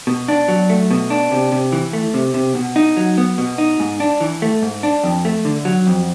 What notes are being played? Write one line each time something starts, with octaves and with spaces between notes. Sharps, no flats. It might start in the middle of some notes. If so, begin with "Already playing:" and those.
B2
D4
F#3
A3
B2
D4
C3
C3
E3
A3
C3
C3
B2
D#4
F#3
B3
B2
D#4
G#2
D4
E3
A3
G#2
D4
F2
A3
D3
F#3
F2